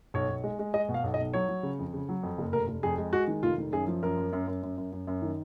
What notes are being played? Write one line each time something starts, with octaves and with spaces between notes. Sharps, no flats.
B1 C#5
B1
G#3
G#3
G#3 D#5
B2
F5
B1
D#5
B1
F#3 C#5
F#3
C#3
F2
C#3
F#3
F2
F#1
F1 A#4
F1
F2 G#4
G#3
G#3 F#4
D#3
F1 F4
D#3
F#2 G#4
F3
F#2 A#4
F#2
F#2
F#2
F#2
F#2
F#2
F#2
D#3